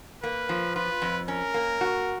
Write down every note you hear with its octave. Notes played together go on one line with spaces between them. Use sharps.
A#3 B4
F3
F4 B4
F2
C#4 A#4
A#3
F#4